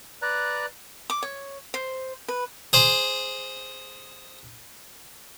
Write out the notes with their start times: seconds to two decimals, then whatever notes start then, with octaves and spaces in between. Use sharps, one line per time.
0.22 B4 D5 A#5 F#6
1.10 D6
1.23 C#5
1.74 C5
2.28 B4
2.73 G#4 C5